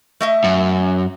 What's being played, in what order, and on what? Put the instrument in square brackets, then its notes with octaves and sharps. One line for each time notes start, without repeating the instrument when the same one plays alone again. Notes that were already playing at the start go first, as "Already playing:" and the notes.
[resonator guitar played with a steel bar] A3 D#5 E5
[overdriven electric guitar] F#2